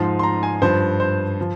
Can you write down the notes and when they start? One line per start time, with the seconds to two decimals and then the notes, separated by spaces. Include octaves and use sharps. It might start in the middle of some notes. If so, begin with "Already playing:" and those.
Already playing: G#2 F3 C6
0.19 C6
0.23 A#5
0.43 G#5
0.62 G2 F3 C5
1.00 C5
1.41 F3